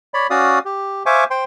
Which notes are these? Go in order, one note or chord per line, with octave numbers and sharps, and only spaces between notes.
C#5 D5 B5
C#4 F#4 D5 F5 D#6
G4
C5 E5 F5 G#5 C#6 D6
C5 G5 C6